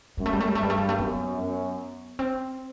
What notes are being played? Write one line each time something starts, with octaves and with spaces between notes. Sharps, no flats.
F#2 G3
A3
G3
A3
G3
A3
G2 G3
A3
G3
A3
F#2 B3
F#2
C4